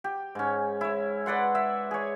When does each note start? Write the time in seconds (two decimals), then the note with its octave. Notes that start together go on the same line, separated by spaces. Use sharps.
0.04 G4
0.35 G#2 C#4
0.81 E4 C#5
1.26 B4 D5 F#5 C6
1.55 E5
1.91 G#4 C#5